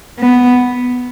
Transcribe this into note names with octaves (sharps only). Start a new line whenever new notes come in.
B3